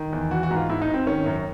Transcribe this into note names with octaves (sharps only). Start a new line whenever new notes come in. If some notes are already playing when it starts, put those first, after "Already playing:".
Already playing: D#3
E2
E3 F#4
F#4
G#2
F4
G#2 E4
D#4
G#2
C4
D#3 C#4
F#2